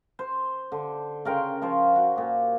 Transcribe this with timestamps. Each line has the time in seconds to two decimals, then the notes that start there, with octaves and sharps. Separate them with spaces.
0.19 C5
0.72 D3
1.25 C#3 A#4 G5 C6
1.62 F3 F4 C5 C#5
1.96 F#4
2.16 A#2 G4